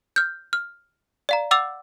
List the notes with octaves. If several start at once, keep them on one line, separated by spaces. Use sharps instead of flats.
F6 G6
F6
D5 F5 A#5
F#5 D6 E6 A6 F7